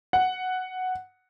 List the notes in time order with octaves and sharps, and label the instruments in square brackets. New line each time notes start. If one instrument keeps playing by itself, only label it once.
[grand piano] F#5